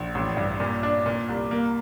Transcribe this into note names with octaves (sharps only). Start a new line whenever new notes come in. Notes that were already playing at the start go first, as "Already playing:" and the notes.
Already playing: A#1
A1
G2
A#2
D4
A#2
C2
A#3